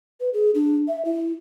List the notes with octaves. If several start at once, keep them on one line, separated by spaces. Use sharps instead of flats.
B4
G#4
D4
E5
E4